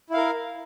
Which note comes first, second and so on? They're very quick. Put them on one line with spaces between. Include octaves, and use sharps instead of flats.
E4 F5 A#4